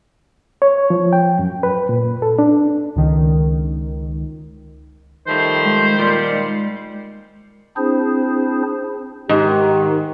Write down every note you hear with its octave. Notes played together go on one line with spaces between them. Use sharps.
C#5
F3
G5
F#2
B4
A#2
A4
D4
C#2 D#3
D#3 F3 G3 A3 C5
G#3
A#2 G3
G#3
C4 D4 E4 G#4 C5
G#2 D#3 G4